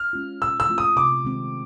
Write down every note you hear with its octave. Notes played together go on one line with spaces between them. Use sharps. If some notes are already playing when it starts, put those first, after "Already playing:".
Already playing: F6
G#3 C#4 F4
A#2 E6
E6
F3 A3 C4 F4
D#6
C3 D6
D#3 G#3 C4